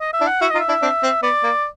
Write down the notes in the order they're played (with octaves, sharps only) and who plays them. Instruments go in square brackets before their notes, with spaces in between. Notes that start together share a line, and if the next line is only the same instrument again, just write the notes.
[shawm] D#5
E5
[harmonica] D4 E4
[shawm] F#5
[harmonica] E4 F#4 [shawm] E5
[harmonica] D#4 F4 [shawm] D#5
[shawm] E5
[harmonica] D4 E4
C4 D4
C4
[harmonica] B3 [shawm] D5
[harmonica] A#3